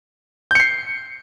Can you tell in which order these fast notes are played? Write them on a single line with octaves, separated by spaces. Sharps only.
G6 C#7 C7